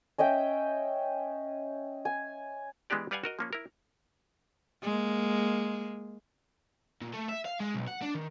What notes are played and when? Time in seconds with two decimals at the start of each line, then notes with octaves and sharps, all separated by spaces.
0.18 C#4 D#5 E5 G5
2.05 G#5
2.90 E3 G#3 B3 D4 G4 D5
3.11 G3 B4 D5 F5 F#5 G#5
3.24 F#4 A#4 D#5
3.39 F3 A#3 C#4
3.53 E4 A#4
4.83 G#3 A#3
7.02 A#2
7.14 A3
7.29 E5
7.45 F5
7.60 G#3
7.74 B1
7.87 F#5
8.02 D4
8.15 D#3